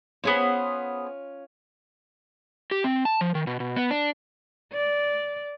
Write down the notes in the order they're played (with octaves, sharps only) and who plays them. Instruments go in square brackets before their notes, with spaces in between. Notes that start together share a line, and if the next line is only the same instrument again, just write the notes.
[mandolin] B3 G#4 C5 [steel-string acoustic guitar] C#4 F4
[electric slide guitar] G4
C4
A5
F3
D#3
B2
B2
B3
D4
[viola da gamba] D5